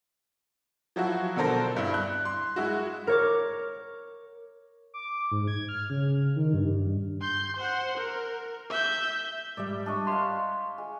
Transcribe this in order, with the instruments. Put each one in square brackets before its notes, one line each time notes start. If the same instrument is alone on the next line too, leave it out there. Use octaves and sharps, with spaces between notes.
[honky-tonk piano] F3 F#3 E4 F#4
B2 D3 A4 A#4 C5 A#6
G2 E4
F#6
C6
G#3 E4 F#4
[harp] A#4 C#5 D6
[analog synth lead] D6
G#2
G#6
F6
C#3
D#3
G2
[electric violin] C6 G6
C5 F#5
A#4
E5 G6
[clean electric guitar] G#2 G3 [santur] D5 E5
[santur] D4 D#5 C#6
[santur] G4 C#5 F5 [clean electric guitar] E5 C6
[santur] G#3